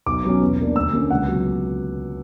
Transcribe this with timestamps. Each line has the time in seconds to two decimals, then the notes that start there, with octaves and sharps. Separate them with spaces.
0.06 B1 D6
0.24 B2 F#3 C#4
0.41 E2
0.58 B2 A#3 D4
0.76 D2 E6
0.93 D3 A#3 C#4
1.11 C#2 F#5
1.28 B2 F#3